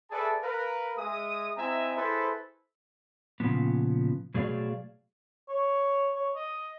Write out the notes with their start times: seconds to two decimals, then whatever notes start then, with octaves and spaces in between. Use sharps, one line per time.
0.11 G#4 A4 B4 D5 E5 A5
0.42 A#4 B4 F5
0.97 G#3 G#4 E5 D#6
1.57 C4 E4 D#5 E5 G#5 A#5
1.96 E4 G#4 A4 B4 C5
3.40 A#2 C#3 F3 B3
4.34 B2 F#3 A3 G#4 D5 F5
5.49 C#5
6.15 C#5
6.35 D#5